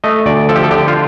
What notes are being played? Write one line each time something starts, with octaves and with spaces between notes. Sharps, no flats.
A3 D#5
D2 D5
F3 A4
G4
A4
D3 G4
F4